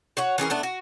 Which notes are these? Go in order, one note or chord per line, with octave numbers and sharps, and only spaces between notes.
F#4 C#5 F#5
E3 C#4 G#4 A#4
A3 B3 D4
F#4